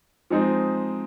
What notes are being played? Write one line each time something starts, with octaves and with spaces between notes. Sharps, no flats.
F3 G#3 C4 D#4